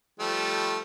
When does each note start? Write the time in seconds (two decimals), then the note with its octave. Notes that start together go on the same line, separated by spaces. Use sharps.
0.20 F3 G3 A3